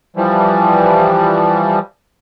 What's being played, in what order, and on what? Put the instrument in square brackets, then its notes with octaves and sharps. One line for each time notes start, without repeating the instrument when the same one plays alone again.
[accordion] E3 F3 G3